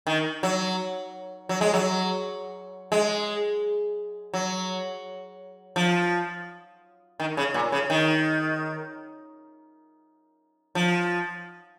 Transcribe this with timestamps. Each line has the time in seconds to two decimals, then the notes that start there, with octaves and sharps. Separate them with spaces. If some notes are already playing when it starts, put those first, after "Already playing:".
0.07 D#3
0.43 F#3
1.49 F#3
1.61 G#3
1.74 F#3
2.92 G#3
4.34 F#3
5.76 F3
7.20 D#3
7.37 C#3
7.54 A#2
7.72 C#3
7.90 D#3
10.75 F3